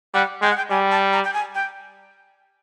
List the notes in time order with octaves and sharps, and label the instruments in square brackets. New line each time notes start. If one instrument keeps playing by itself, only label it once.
[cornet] G3 [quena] F#5
[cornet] G#3 [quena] G5
[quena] F#5
G5
[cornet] G3 [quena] G#5
[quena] A5
A#5
G5
G#5
G5